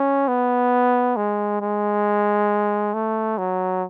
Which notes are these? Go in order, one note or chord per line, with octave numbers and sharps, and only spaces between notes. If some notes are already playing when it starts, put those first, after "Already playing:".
Already playing: C#4
B3
G#3
G#3
A3
F#3